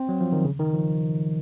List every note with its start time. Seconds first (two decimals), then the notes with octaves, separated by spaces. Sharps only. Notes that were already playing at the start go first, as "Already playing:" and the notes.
Already playing: C4
0.09 F#3
0.20 F3
0.33 D#3
0.45 C#3
0.59 D#3
0.74 F3